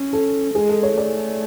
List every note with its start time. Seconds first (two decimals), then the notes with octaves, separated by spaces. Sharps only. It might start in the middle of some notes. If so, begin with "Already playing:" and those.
Already playing: C#4
0.13 A4
0.55 G#3 G#4
0.69 A4
0.83 C#5
0.97 A3 D5